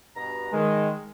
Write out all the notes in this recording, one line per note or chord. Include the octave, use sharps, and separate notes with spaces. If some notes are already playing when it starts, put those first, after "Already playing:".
G2 B2 A#5
D#3 G#3